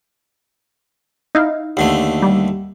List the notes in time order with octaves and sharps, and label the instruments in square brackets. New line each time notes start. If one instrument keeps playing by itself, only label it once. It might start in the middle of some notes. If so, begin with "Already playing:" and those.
[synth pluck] D#4 E4 F5
[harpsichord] D#2 D3 A3
[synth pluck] G3